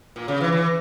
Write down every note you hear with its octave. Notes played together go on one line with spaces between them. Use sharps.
A#2
C#3
E3
E3